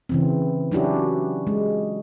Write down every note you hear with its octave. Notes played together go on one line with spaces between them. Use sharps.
C#3 E3 C4
F#3 C#4 D4 E4 F#4 G4
G#3